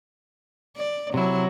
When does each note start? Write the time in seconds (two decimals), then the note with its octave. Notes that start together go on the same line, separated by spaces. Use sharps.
0.77 D5
1.14 C3 F#3 E4